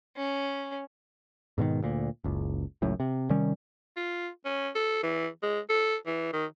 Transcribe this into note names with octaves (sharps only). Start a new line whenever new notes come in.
C#4
G#2 B2 D3 D#3
D2 A#2
F#1 C#2
F#1 C#2 F#2 A2
C3
C3 D#3 G3 C#4
F4
C#4
A4
E3
G#3
A4
E3
D#3